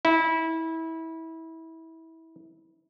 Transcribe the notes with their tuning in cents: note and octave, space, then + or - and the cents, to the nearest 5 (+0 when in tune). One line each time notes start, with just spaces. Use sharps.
E4 -25